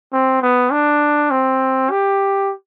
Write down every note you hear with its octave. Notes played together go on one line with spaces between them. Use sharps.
C4
B3
D4
C4
G4